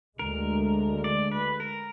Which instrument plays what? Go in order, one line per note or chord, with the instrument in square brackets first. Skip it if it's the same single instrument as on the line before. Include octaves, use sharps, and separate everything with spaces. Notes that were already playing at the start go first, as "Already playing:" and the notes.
[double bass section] D2 D3 G#3 [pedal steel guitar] A#4
[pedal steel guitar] D5
B4
A#4